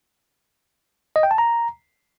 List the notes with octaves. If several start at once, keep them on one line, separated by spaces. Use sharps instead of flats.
D#5
G5
A5
A#5